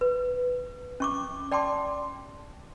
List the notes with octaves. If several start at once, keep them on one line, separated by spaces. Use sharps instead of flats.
B4
C#4 C#6 D6
D5 G5 A5 C6 D6